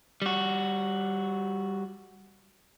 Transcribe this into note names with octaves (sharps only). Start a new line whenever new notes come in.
G3 F#4